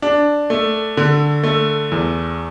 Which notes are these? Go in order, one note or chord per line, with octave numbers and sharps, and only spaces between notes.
D4
A3
D3
A3
E2